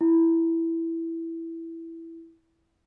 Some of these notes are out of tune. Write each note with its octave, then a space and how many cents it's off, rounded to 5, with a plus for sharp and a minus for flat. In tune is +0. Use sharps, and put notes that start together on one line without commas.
E4 +0